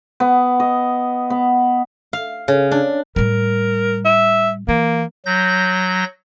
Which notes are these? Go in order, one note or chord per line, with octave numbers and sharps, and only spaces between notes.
B3
D#5
B3
F5
C#3
D4
A2 G3 A#4
E5
E3 A#3
F#3 G6 A#6